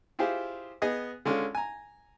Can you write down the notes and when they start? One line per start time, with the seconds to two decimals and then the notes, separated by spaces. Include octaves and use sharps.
0.19 E4 F4 G4 G#4 C5
0.82 B3 G#4 D#5 G#5 D#6
1.25 D3 G#3 C#4 F4
1.55 G#5 A#5